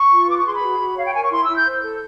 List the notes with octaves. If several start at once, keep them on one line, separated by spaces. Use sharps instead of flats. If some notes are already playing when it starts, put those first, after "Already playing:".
Already playing: C#6
F4
B4 D6
C#6
G#4 C6
B5
F#4
F#4
C#5 F5
G5
A#4 G#5
C#6
E4 C6
E6
E4
G6
C5
A4